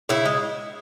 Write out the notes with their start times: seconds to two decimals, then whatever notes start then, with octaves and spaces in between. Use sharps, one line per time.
0.09 C#3 E4
0.25 G#3